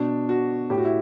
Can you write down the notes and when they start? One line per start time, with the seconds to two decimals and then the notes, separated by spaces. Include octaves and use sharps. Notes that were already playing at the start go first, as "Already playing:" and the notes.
Already playing: B2 D4
0.29 F#4
0.70 A2 G4
0.78 F#4
0.85 E4